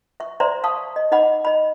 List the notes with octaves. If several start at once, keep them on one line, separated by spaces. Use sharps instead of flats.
E5 C#6
C5 D5 E5 A#5 C6
F5 A5 C#6 D#6
D#5
D#4 D#5 F#5 B5 D6
D#5 B5